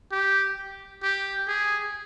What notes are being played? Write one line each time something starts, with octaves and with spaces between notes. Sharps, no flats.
G4
G4
G#4